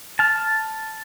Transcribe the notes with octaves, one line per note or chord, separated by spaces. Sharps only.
A5 F6